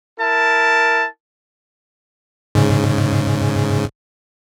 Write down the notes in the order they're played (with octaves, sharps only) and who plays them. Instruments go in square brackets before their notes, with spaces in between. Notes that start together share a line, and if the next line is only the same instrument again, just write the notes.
[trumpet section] E4 A#4 A5
[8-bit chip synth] G#2 C#3